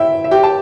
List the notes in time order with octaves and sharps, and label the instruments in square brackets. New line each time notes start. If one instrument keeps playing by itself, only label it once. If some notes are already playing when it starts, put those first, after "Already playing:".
Already playing: [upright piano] E4 E5 G5
E5
G4 G5
A5